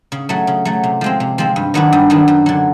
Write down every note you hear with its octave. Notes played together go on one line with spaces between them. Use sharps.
C#3
F#3 A3
C#3
F#3 A3
C3
F3 G#3 C4
C3
F3 G#3 C4
G2
D#3 F#3 B3 D4
G2
D#3 F#3 B3 D4
F#2
D3 F#3